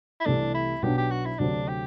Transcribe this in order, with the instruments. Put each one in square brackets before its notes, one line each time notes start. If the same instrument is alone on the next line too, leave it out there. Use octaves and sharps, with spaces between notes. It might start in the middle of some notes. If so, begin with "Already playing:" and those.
[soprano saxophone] E4
[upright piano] C2 C3 E3 A3 [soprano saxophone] D4
[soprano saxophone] E4
[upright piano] B1 B2 F#3 B3 D4 [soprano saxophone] G4
[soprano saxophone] G4
F#4
E4
[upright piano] D2 C3 F#3 A3 C4 [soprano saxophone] D4
[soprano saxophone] G4